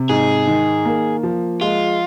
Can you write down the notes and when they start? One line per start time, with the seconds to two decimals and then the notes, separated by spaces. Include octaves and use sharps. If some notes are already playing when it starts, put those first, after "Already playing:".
Already playing: C3
0.09 G#2 G#4
0.47 D#3
0.85 A#3
1.23 F3
1.61 G#3 F4